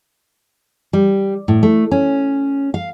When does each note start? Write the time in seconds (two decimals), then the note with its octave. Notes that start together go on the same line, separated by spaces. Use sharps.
0.93 G3
1.48 A2
1.63 A3
1.91 C#4
2.74 F5